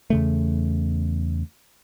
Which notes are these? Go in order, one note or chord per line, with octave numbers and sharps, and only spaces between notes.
E2 C#3 A3